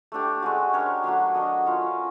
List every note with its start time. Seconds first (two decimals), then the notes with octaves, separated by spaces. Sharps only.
0.12 A3 D4 G4
0.42 G#3 C#4 F#4
0.73 D4 G4 A#4 C#5
1.04 F#3 A3 D4 F#4
1.34 D4 F#4 A#4 D#5
1.65 C#4 F4 A#4 C#5